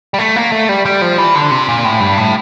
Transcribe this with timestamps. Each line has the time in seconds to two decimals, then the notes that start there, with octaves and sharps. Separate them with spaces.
0.14 G3
0.19 A3
0.36 A#3
0.52 A3
0.69 G3
0.85 G3
1.02 F3
1.18 E3
1.35 D3
1.51 C3
1.69 A#2
1.85 A2
2.01 G2
2.18 A2